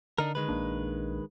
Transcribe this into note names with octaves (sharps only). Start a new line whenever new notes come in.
D3 D4 D#4 A#4
D#3 G#3 B4
A#1 A#3 D4